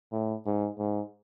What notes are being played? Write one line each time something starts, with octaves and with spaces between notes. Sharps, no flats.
A2
G#2
G#2